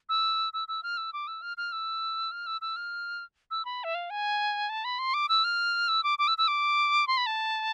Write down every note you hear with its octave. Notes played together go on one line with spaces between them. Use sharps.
E6
E6
E6
F6
E6
D6
E6
F6
F6
E6
F6
E6
E6
F6
E6
B5
E5
F5
G#5
A5
B5
C6
D6
E6
F6
E6
D6
D6
E6
E6
D6
C6
B5
A5